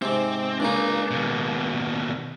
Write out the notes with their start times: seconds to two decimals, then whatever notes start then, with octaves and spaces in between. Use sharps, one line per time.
0.02 G#2 C3 C4
0.60 C#2 C#3 A#3 D4 A#5
1.11 D#2 B2